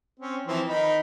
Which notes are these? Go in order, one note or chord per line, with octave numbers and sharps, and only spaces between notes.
C4 C#4
E3 F3 C4
D#3 D#4 B5